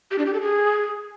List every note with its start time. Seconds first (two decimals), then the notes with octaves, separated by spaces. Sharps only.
0.11 G4
0.18 D4
0.26 G4
0.33 A4
0.41 G#4